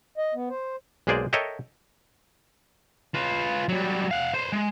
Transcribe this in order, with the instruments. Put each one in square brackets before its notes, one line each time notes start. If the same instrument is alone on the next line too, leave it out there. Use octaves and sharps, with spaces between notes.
[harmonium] D#5
B3
C5
[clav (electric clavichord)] B1 G#3 A#3 G#4 C5 D5
A4 A#4 C#5 D#5 E5 G5
[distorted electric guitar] F4 B4
F#3 G3
F5 F#5
B4 C5
G#3